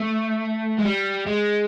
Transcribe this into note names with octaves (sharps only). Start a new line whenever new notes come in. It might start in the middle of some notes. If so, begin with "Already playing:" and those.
Already playing: A3
G#3
G3
G#3